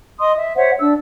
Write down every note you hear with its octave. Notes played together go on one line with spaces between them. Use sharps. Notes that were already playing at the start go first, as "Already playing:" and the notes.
D#5 C6 D#6
E5
C5 C#5 E5 F#5
D4 E6